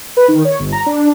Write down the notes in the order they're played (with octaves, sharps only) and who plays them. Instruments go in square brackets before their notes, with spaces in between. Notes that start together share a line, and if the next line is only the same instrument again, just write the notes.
[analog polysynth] B4
D#3
C#5
G1
A#5
D4